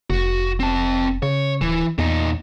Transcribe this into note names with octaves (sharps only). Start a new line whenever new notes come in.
F1 F#4
C4 A5
C#3 C#5
D1 E3
E2 A#2 D#4